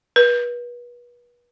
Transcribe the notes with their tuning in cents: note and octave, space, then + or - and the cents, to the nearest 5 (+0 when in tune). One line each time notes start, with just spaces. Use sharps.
B4 -35